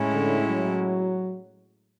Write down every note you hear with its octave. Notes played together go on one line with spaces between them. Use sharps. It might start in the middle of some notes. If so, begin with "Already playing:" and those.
Already playing: A2 G#3 C#4 E4
D3
F#3